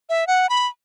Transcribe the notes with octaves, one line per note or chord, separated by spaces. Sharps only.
E5
F#5
B5